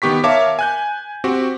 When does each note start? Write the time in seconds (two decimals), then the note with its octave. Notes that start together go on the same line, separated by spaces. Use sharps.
0.02 D#3 B3 G4 C#6 B6
0.24 A#4 C#5 E5 F5 A5 D6
0.59 G#5 F#6 G6
1.24 C4 F#4 G4